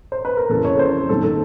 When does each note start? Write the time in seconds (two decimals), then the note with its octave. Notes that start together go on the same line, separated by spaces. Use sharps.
0.12 C5
0.25 B4
0.37 A#4
0.49 F2 C#3 E3 A4
0.65 C#5
0.79 C5
1.09 G2 D#3 G3 C4 A4
1.23 A4